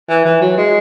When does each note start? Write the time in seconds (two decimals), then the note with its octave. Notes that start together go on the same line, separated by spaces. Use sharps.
0.09 E3
0.25 E3
0.41 F#3
0.57 G#3